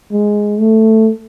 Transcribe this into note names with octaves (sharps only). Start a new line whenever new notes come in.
G#3
A3